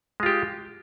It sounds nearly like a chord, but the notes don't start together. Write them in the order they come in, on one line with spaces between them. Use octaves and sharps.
G#3 F4 G4